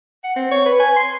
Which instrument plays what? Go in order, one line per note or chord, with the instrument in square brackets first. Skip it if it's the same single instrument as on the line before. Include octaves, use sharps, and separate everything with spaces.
[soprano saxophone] F#5
C4
C#5
B4
G#5
C6